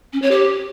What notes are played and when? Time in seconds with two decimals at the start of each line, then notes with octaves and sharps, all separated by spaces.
0.13 C#4
0.22 C#5
0.31 G4